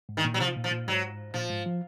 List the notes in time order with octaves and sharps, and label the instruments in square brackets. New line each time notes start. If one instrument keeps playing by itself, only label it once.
[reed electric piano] G#2
[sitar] D#3
[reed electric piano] A#2
[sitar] F#3
[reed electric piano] C3 [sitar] F3
[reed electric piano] A#2
[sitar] F3
[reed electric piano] A#2
[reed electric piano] G#2 [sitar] F#3
[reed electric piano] A#2 [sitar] F3
[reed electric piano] G#2
F3